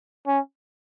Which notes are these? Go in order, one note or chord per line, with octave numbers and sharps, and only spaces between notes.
C#4